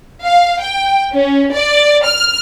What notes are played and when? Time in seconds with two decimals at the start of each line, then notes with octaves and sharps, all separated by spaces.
0.23 F5
0.61 G5
1.13 C#4
1.52 D5
2.05 F6